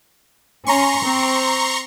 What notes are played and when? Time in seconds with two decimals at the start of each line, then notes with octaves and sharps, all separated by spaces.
0.67 C#4 A#5 C6 C#6
1.04 C4